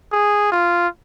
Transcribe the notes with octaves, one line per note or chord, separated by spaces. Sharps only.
G#4
F4